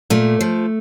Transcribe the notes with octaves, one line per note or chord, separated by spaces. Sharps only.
A#2 A3
F3